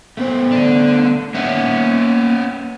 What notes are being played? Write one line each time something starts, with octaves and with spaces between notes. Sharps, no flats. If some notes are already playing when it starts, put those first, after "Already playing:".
A3 B3 C5
D3 D4
A#3 B3 C#4 E5 F#5